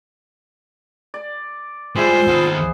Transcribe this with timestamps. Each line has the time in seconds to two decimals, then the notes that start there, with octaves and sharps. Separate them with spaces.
1.14 D5
1.96 G3 G#3 E4 F4 G#4 C5
2.28 D#2 B3 A4